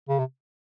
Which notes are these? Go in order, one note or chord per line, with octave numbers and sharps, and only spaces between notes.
C#3
C3